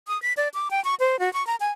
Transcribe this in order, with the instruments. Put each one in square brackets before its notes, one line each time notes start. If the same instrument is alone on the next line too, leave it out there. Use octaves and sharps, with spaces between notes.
[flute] D#6
B6
D5
D6
G5
C#6
C5
F#4
C#6
A#5
G#5